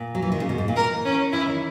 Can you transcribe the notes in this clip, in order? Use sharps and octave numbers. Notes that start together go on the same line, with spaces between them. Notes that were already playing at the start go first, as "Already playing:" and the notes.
Already playing: A#2
F#3
E3
D#3
C#3
B2
G#2
A#2
E3 A#4
C#4
E3 E4
D#3